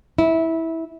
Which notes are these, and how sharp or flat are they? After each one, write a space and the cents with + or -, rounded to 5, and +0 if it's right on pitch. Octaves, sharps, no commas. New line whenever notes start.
E4 -15